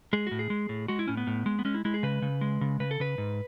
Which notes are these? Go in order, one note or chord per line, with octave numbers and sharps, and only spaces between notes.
G#3 G#4
A2 F#4
G#4
G#3
A2
G#3 F#4
E4
A2 C#4
B3
A2
G#3
B3
G#3 C#4
E4
G#3 E4
G#4
C#3 B4
C#3
G#3
C#3
C#3 B4
A4
C#3 B4
G#2